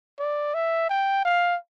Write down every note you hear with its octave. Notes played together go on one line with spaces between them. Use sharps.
D5
E5
G5
F5